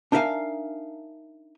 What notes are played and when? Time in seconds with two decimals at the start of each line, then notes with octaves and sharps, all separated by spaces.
0.12 D4 D#4 A#4 E5 F5 G#5